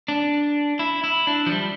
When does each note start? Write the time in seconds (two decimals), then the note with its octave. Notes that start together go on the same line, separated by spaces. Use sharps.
0.08 D4
0.79 E4
1.04 E4
1.27 D4
1.46 F3
1.51 G3